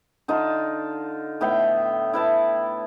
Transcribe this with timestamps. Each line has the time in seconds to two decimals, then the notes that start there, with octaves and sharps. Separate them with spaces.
0.28 D3 D#4 F4 A5
1.41 A2 B3 E5 G5
2.13 E4 B4 A5